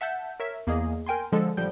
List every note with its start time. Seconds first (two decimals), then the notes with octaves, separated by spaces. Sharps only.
0.01 E5 F#5 A5 G6
0.40 A#4 C#5 E5
0.67 E2 A#3 G#4 D#5
1.06 A#4 G5 G#5 C6
1.32 D3 F3 G#3 A4
1.57 A1 D3 F3 G3 G5 G6